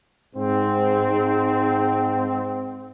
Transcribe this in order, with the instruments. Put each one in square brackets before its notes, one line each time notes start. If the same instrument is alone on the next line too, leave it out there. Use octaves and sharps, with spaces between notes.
[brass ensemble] G#2 C4